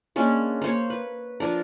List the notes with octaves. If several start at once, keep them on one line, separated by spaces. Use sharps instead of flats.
G#3 A#3 C#4 D4
A#3 C5 C#5
B4
F3 D4 A#4